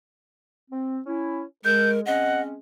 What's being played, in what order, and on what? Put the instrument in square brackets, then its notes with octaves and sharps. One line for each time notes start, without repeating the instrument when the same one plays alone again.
[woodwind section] C4
C#4 E4
[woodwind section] G#3 [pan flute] A#4 [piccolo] G6
[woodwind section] G#3 C4 C#4 [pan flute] D#5 [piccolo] F#5